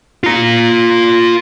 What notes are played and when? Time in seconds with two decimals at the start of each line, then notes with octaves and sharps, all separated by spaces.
0.24 F4 A#5